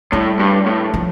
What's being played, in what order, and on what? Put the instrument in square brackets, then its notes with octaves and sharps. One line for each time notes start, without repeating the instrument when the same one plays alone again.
[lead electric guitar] A2 [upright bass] G3
[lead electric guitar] G2
A2
[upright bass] F3